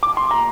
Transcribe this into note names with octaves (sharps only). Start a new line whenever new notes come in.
D6
C6
A#5